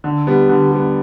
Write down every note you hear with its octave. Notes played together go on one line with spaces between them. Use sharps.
D3
G3 B3
D3
G3 B3